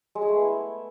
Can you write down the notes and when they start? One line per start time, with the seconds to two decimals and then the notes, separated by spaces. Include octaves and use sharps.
0.15 G#3
0.22 G#4
0.28 A3
0.35 B3
0.41 E4